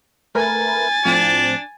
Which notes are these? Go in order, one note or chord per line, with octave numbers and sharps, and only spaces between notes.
A3 A#4 B4 G#5 A6
A2 F3 C4 D4